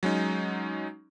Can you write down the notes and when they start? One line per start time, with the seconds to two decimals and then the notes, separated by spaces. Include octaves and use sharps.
0.03 F#3 G#3 C#4 D#4